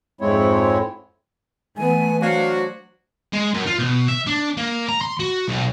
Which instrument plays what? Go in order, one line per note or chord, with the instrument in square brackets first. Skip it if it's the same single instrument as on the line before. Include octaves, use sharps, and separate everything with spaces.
[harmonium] F2 G#2 G#3 C4 E4 C#5
[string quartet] E3 B3 [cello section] A3 [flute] G#5
[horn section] F#3 D4 F#4 [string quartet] C5 [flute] F5
[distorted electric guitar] G#3
F#2
F4
B2
E5
D4
A#3
A#5
C6
F#4
B1